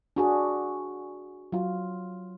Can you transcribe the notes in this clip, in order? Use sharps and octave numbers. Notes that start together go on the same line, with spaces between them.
D4 F#4 G#4
F#3 F4